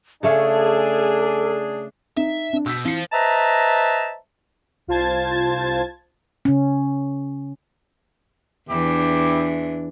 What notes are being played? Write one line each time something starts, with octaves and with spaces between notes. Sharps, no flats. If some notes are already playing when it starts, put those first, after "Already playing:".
C#3 A3 D4 G#4 A4 C#5
D#4 E5
D4
B2 E6 G6 B6
E3 C5 F5 C#7
B4 C5 D#5 E5 A5 A#5
C2 F4 C5 A5 G#6 A6
C#3 C#4
E2 E3 D4 E4 G4